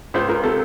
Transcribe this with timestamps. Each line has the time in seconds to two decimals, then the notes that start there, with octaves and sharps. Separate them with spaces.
0.14 C#2 C5
0.29 C#2 A#4
0.43 C3 A4